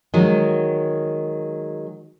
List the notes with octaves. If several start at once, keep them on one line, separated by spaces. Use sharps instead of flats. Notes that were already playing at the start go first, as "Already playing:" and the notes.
D#3 F#3 G#3